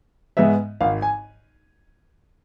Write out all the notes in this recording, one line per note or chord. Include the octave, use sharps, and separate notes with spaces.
G#2 G#3 B3 E5
G#1 F5
G#5